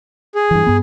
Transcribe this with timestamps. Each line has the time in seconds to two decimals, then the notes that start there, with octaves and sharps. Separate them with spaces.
0.35 G#4
0.51 G2 E3
0.67 G2 B3